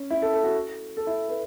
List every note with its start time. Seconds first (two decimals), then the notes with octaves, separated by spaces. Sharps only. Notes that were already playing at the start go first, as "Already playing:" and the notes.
Already playing: C#4
0.10 E4
0.22 A4
0.33 A4
0.44 F#4
0.97 A4
1.07 E4
1.29 B4